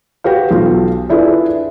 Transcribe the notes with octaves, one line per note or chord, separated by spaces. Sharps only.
F#4 G4 B4 F5
B1 F4
D4 E4 F4 G#4 A4 B4